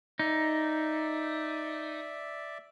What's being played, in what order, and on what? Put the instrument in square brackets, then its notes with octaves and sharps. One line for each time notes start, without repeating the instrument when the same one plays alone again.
[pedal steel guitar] D#4 [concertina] D5 E5